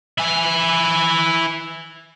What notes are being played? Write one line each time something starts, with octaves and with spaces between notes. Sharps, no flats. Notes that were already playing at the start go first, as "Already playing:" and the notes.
E4 G#5